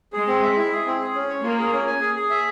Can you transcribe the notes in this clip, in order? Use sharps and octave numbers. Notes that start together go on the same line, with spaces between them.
G#3 G#4
C4
E5
E4
G#4
C4
G#4
C#4
C#5
A#3 F4
G#4
C#4
G#5
G#4
G#4
E5